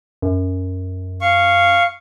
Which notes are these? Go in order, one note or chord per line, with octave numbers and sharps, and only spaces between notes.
F#2
F5 C#6